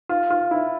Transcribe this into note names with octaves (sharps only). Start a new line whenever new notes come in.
F4
F4
E4